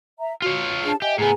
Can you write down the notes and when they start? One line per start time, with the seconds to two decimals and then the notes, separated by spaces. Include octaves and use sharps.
0.20 E5 A#5
0.42 F4 F#4 C#5
0.84 D4 G#4 A5
1.02 G4 D#5 E5 G#5
1.18 A2 B3 G#4 G#5 A#5